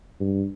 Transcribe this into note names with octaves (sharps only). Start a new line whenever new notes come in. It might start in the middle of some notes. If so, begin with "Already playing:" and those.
G2